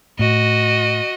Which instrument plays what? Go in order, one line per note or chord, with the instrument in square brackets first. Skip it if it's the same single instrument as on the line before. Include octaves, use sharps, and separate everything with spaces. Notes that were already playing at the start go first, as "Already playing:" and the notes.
[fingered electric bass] A2 [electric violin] F#4 D#5